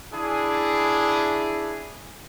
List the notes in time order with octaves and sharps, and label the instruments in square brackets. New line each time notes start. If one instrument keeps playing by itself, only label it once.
[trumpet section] D4 E4 G#4